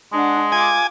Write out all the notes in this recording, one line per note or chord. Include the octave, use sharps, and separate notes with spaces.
G#3 D4 F#5
F4 G#5 D6